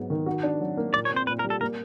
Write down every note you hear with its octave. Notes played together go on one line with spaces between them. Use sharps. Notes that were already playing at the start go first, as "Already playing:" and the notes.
Already playing: G#2 F#3 B3
D#3
F#4
D4
F#3
A#3
A#2 D5
C#5
C4
C5
A#2 B4
A#4
G3
A4
A#3 A#4